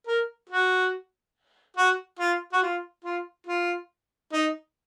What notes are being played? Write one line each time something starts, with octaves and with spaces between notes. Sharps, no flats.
A#4
F#4
F#4
F4
F#4
F4
F4
F4
D#4